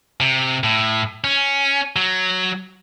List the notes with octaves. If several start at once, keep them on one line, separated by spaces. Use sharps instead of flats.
C3
A2
C#4
F#3